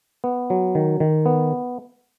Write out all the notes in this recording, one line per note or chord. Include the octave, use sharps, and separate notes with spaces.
B3
F#3
D#3
D#3
B3